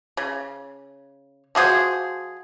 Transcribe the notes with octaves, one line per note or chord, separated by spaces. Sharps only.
C#3
F3 F#4 G#4 C5